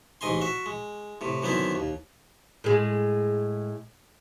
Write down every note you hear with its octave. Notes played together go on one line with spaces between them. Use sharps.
A1 G#2 D#5 G#5 C6
F#4 E5
G#3
A2 C3
F#2 D3 D#3 B3 C4 E4
D#2
A2 G#3